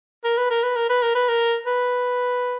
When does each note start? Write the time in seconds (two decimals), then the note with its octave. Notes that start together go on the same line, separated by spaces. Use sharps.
0.24 A#4
0.37 B4
0.50 A#4
0.63 B4
0.76 A#4
0.89 B4
1.02 A#4
1.15 B4
1.28 A#4
1.66 B4